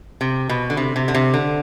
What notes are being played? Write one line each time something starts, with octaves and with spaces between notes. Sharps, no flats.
C3
B2
D3
C3
C3
D3
C3
D3